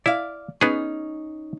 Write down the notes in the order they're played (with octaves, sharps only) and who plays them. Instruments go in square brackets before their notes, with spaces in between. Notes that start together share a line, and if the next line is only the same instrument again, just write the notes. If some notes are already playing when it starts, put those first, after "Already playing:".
[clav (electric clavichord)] E4 [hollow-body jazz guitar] D5 F5
[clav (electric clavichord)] B3 G#4 [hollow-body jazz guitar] C#4 D#4